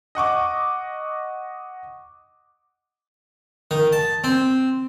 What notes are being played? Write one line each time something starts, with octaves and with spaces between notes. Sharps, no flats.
D#5 F#5 C#6 D6
D#3
A5
C4